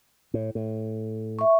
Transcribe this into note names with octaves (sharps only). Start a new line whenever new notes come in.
A2
A2
E5 C#6